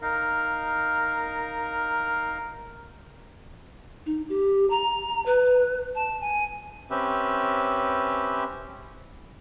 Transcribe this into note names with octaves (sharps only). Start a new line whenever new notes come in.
D#4 A#4 F5
D#4
G4
A#5
B4
A5
G#5
C4 C#4 G4 B4 E5